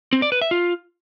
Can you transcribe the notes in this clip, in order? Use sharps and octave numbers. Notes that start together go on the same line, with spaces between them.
C4
D5
B4
E5
F4